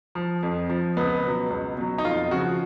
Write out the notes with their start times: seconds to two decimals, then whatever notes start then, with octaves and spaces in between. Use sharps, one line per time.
0.15 F3
0.43 F2
0.70 F3
0.97 C#2 B3
1.24 B2 F#3
1.50 C#2
1.77 B2 F#3
1.98 D#4
2.04 F2 F4
2.31 C#3 F3 F#4